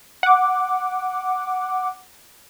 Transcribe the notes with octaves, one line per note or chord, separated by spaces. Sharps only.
F#5 D6